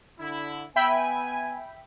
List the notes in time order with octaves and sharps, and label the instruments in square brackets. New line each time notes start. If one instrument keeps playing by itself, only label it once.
[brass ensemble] D3 E4
[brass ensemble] B3 G#5 [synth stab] E5 G5 B5